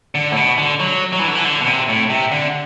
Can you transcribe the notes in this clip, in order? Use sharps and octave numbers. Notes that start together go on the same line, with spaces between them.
D3
A2
B2
D3
F#3
F#3
E3
D3
E3
D3
B2
C3
A2
C3
D3